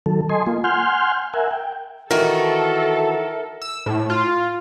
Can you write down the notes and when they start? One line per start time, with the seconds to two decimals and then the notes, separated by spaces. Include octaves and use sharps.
0.06 D#3 F#3 A4
0.29 A4 D#5 G#5 C6
0.46 A#3 F4
0.64 F#5 G#5 C6 F6 G6
1.34 A#4 E5 F#5 G#5
1.51 G5
2.11 D#3 E3 F#4 A4 A#4 E5
3.62 E6
3.86 A2
4.10 F4